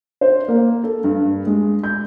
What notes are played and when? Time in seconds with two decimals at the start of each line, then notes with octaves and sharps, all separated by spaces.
0.21 C5
0.48 A#3
0.83 A4
1.04 G2
1.47 G#3
1.84 G6